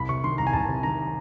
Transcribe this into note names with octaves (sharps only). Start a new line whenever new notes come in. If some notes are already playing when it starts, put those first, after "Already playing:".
Already playing: C2 B5
C3 C#6
D#3 C6
C2 A#5
G#5
C2 A5
C3
D#3 A#5